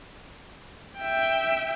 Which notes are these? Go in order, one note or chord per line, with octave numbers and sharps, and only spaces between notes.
E5 G5